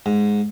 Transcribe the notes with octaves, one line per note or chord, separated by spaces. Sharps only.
G#2